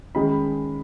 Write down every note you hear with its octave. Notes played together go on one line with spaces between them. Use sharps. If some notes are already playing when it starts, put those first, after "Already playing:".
D#3 G#3 C#4 B5